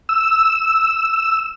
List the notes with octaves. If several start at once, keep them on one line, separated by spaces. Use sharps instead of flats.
E6